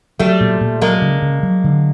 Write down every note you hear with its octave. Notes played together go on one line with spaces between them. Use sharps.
F#3 G3 A3
A#2
A#2
F#3 G#3 A#3
C#3
C#3
F#3
D3